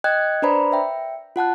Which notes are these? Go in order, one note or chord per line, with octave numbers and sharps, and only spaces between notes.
D#5 G5 F#6 G#6
D4 B4 C5 D5 A#5 B5
E5 G5
F4 F#5 A5 F#6